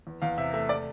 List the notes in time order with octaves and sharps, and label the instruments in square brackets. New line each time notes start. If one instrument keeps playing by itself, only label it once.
[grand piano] E2
E2 F5
C3 E5
A3 E5
D5